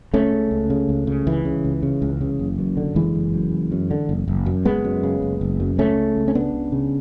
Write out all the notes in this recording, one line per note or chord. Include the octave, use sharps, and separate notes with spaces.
C#2 A3 C#4
C#3
C#2
C#3
C#2
C#3
C#2 E3
C#3
C#2
C#3
C#2
C#3
F#1
F#2
D3
F#1 E3 G#3
F#1
F#2
F#1
F#2
D3
F#1
F#1
F#2
F#1 G#3 B3
F#2
C#3
F#1
F#1
F#2
C#2 A3 C#4
C#3
C#2
C#4
C#3 B3 D4
C#2
C#3